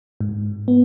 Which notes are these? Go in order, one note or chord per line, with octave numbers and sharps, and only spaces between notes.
G#2
B3